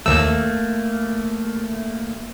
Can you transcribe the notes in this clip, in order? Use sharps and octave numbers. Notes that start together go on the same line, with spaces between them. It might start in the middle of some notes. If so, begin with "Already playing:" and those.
D#2 A3 A#3 E6